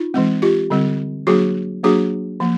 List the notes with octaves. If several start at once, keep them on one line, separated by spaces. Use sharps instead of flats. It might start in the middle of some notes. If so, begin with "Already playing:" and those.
Already playing: D#4 F4
E3 G#3 C4
F4 G4
D3 G3 C4
F#3 A#3 D4 F#4 G#4
F#3 A#3 D4 F#4 G#4
F3 A#3